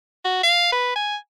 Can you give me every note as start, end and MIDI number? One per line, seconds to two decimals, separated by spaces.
0.25 0.43 66
0.43 0.68 77
0.72 0.93 71
0.96 1.16 80